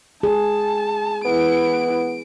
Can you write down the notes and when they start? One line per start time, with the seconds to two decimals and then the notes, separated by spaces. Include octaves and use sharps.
0.23 G#4 A5
1.25 E3 B3 E4 D7